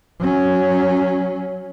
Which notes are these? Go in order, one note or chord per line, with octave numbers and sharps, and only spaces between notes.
F#3 C#4